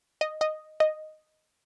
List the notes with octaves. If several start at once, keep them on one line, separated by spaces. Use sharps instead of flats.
D#5
D#5
D#5